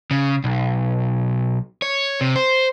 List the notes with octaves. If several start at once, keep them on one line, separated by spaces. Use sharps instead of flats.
C#3
B1
C#5
C3
C5